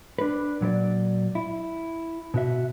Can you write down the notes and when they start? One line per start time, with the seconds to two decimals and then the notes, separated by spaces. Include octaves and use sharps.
0.19 D4 B4
0.61 A#2 F#3 B4 D5
1.35 E4
2.34 B2 F#4 E5